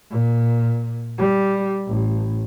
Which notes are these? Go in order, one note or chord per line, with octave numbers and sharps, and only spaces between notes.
A#2
G3
A1